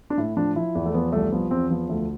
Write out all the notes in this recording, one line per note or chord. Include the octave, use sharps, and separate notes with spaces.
D4
A2 E4
F3 D4
F3 E4
E2
A3
F3 B3
C2 A3
F3 B3
E2 C4
F3 B3
D2 A3